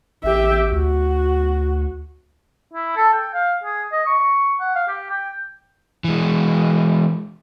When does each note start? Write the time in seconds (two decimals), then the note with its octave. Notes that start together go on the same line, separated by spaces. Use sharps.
0.24 A1 G4 E5
0.72 D2 F#4
2.73 E4
2.96 A4
3.13 G5
3.34 F5
3.64 G#4
3.92 D#5
4.07 C#6
4.60 F#5
4.75 F5
4.88 G4
5.10 G5
6.04 E3 G#3